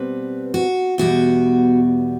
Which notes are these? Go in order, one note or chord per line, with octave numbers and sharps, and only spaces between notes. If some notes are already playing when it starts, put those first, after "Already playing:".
Already playing: B2 G3 C4 B4
F#4
E2 B2 G3 F#4